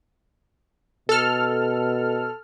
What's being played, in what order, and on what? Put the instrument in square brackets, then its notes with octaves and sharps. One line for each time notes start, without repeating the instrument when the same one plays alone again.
[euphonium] B2 [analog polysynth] A4 F6